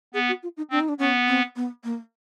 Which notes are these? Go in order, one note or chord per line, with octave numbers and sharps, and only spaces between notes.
B3 G#4
F#4
F4
D#4
C4 D4
D#4
D4
B3 C#4
C4
B3
A#3